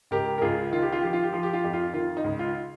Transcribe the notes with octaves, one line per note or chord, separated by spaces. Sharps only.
C#2 G4 A#4
A#4
C#2 F4 G#4
D#3 F4
G4
F4
F3 G4
F4
G4
F3 F4
G4
F4
F2 G4
F4
D#3 F4
D#4
C#2
F4